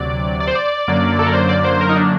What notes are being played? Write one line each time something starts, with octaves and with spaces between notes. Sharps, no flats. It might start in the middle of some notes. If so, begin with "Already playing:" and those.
Already playing: D2 C3 F#3 D5
D5
C5
D5
F#2 D3 F#3 A#3
A4
A#4
C5
D5
C5
A#4
D#4
D4